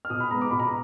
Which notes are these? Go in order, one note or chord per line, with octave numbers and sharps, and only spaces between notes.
F6
B2 D#6
B5
G#3 B3 A#5
D6
B2 B5
A#5